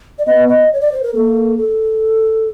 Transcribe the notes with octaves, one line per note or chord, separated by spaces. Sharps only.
D5
B3 D#5
D#5
C#5
D5
C5
A#4
A#3 A4
A4